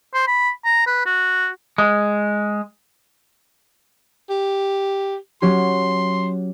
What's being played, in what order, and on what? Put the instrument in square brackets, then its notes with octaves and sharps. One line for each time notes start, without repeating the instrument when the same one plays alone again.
[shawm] C5
B5
A#5
B4
F#4
[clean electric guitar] G#3
[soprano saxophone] G4
[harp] F#3 C#4 G4 [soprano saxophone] C6